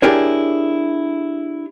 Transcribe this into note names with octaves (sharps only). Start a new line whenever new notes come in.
D4 E4 G4 G#4 A#4 C#5